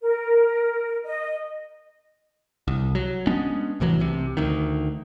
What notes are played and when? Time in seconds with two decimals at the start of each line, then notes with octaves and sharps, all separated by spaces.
0.01 A#4
1.04 D#5
2.68 C2
2.95 F#3
3.27 G#3 B3 C#4 D4
3.80 C2 A2 E3 F#3
4.00 C2 C3
4.37 D2 D#3